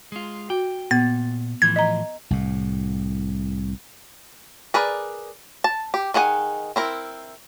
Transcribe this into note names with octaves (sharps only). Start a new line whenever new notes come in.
G#3 F4
F#4 G5
A#2 B3 A6
A2 E3 F3 G#6
D#5 A#5
C2 A2
G#4 A#4 B4 D5
A5
G4
D#3 G#4 F#5 G#5
C4 E4 A#4